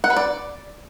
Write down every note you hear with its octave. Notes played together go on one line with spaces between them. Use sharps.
F#5
B4
D5